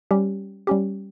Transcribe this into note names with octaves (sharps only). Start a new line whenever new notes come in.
G3 C#4 G4
G3 C#4 G4